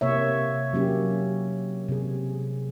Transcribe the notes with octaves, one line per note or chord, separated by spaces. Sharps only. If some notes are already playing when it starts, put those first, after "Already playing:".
C3 A#3 C#5 E5
F#3 A#3 C#4 G4
C3 G#4